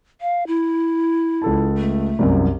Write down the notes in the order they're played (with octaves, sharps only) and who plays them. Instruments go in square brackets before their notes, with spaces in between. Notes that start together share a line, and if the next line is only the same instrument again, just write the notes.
[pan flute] F5
E4
[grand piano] C#2 A4 A5
[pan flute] A3
[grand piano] C2 F#2